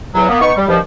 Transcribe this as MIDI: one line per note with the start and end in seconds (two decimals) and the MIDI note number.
0.15 0.29 40
0.15 0.29 54
0.29 0.41 58
0.29 0.41 59
0.41 0.52 59
0.41 0.52 63
0.41 0.52 85
0.57 0.66 55
0.68 0.78 43
0.68 0.78 51
0.68 0.78 53